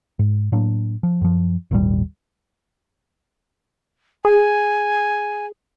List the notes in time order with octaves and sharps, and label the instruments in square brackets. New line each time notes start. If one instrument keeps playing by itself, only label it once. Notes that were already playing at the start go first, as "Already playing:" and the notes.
[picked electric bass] G#2
A2 F#3 A#3 D4
F3
F#2 F3
G#1 D#2 A#2 G3
[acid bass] G#4 [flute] G#5